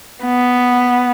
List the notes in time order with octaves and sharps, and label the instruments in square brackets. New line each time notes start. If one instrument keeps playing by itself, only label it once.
[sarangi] B3